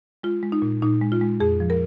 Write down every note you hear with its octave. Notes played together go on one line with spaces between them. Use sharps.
G#3 F4
G#3
D#4
A#2
A#2 D#4
G#3
F4
G#3
F2 G#4
F3
A#4